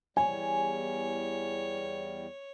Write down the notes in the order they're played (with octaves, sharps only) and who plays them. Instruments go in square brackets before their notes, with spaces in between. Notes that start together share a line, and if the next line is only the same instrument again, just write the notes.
[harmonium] E2 G3 [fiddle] C#5 [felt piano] G#5